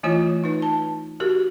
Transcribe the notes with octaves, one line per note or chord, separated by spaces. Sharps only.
E3 A3 E4 F4 C#5
D#4 B4
A5
F#4 G4 A#4